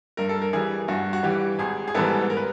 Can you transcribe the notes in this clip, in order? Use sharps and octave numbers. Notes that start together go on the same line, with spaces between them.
G2 A#4
A4
A#4
E3 G3 G#4
G2 F#4
F#4
E3 G3 G4
G#1 G#4
G#4
G#2 E3 G3 B3 A4
A#4
B4